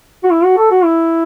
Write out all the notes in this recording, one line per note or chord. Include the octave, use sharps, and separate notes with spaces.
F#4
E4
F#4
A4
F#4
E4